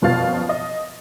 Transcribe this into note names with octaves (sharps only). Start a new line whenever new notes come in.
F#1 F2 B2 F3 F5 A6
D#5